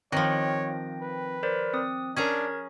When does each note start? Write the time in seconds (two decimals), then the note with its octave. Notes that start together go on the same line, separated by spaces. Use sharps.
0.12 D#3 F3 C4 C#5 G5 A#6
1.01 B4
1.43 A#4 C5 D5
1.73 C4 D#6
2.17 C#4 D4 G#4 A#4 A#5 G#6